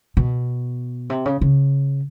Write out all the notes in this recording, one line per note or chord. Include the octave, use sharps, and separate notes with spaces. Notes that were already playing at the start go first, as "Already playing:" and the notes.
B2
C3
C#3
C#3